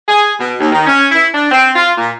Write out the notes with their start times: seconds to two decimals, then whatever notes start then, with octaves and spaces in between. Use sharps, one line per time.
0.09 G#4
0.40 B2
0.60 D#2
0.72 D#3
0.87 C#4
1.12 E4
1.35 D4
1.52 C4
1.76 F4
1.98 A#2